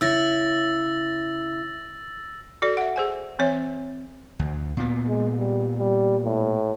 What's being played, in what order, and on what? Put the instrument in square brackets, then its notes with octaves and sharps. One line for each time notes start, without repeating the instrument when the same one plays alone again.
[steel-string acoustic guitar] C#3 E4 [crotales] E6 A6 A#6
[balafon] F#4 A4 D5
E5 F#5
G#4 C5 G#5
E3 C4 C#5 E5
[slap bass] D2
A#2 B3
[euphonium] G#3
G3
G3
A2